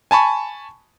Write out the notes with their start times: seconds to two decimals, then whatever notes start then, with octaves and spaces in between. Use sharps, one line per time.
0.11 G#5 A5 B5 C#6